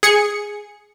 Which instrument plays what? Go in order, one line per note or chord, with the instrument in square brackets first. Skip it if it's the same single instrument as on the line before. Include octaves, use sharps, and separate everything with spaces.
[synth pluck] G#4 C#7